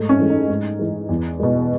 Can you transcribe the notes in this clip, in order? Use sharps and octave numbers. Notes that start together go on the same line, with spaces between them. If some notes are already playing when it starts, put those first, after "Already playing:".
Already playing: G#2 A3
C#4
E3 G#3
D#4
G#2
E3 G#3
E2
B2 G#3